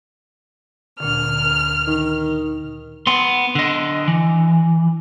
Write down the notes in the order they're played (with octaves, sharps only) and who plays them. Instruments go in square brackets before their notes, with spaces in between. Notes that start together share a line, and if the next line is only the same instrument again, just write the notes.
[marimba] D2 A#2 D3 [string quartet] F6
[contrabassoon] D#3
[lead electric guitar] B3 C6
D3 D#5
E3